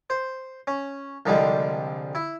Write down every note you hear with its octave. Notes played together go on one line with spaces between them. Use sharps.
C5
C#4
C2 D3 F3 G3 G#3
E4